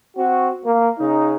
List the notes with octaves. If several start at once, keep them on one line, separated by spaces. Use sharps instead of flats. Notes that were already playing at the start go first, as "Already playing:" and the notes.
C4 F#4
A#3
C#3 D#4